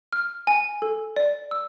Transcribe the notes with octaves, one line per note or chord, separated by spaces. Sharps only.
F6
G#5
A4
D5
E6